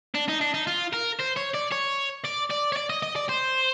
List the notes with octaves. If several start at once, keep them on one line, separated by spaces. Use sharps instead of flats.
D4
D#4
D4
D#4
F4
A#4
C5
C#5
D5
C#5
D5
D5
C#5
D5
D#5
D#5
D5
C5